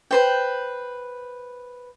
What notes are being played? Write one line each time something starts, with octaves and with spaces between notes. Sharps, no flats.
B4 C5 G5